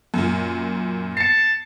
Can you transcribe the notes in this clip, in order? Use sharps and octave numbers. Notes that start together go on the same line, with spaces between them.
F#2 A#2
A5 C7 C#7